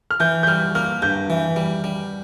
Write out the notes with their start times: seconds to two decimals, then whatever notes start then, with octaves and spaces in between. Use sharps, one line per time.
0.11 F6
0.20 E3 G6
0.43 G6
0.47 G3 F6
0.75 A#3 F6
1.02 G2 G6
1.30 E3
1.56 G3
1.84 G3